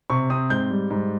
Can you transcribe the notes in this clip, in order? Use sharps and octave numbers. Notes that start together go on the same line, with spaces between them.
C3 C#6
C4 D#6
G#2 G6
G3
G#2